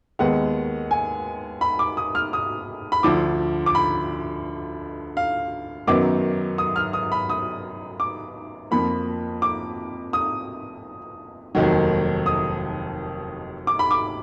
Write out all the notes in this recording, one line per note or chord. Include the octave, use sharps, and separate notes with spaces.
D#2 D#3 G#3 B3 F#5
G#5
B5
D6
D#6
F6
D#6
B5
D2 D3 F3 D6
D6
B5
F5
F#2 D#3 F#3 B3 D6
D#6
F6
D#6
B5
D#6
D6
F2 F3 A#3 B5
D6
D#6
F1 D#2 D#3 F#3
D#6
D6
B5
D6